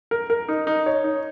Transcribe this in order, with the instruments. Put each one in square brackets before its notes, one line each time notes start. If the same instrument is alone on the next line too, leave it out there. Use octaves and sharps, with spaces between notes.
[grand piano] A#4
A#4
D#4
D#4
C#5
D#4